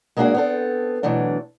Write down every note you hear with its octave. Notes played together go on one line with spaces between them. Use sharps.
G#3 A#3 B3 D4 F#4 G#4
B3 C4 A4
B2 E3 F#3 A3 D4